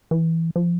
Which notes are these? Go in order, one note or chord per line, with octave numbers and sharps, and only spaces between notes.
E3
F3